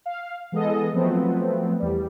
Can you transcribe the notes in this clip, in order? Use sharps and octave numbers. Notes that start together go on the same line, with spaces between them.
F5
E3 G#3 B3 G#4 A4 D#5
F3 F#3 A3 B3 C4
E2 G3